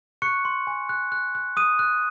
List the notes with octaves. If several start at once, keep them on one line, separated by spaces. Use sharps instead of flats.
C#6 F#6 C#7
C6
G#5
F#6
F#6
F#6
D#6 F#6 D#7
F#6